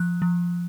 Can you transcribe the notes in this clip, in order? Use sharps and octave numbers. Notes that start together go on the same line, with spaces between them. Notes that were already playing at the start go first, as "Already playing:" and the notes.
Already playing: F3 F#6
F3